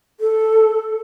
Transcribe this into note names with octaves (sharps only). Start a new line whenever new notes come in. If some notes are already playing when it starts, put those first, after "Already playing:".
A4